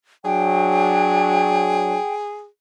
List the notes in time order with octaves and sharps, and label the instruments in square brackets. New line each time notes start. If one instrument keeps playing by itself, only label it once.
[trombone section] F#3 D4 [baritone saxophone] G#4 [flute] G5